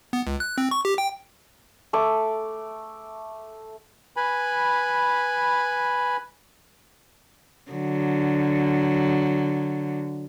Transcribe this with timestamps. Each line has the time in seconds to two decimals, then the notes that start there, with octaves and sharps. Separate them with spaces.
0.13 B3
0.27 C#2
0.40 F#6
0.58 C4
0.71 C#6
0.85 G4
0.98 G5
1.93 A3 D6
4.17 B4 G#5 B5
7.71 D3 F#3